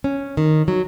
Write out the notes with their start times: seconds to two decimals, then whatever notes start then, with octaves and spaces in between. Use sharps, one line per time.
0.04 C#4
0.37 D#3
0.68 F#3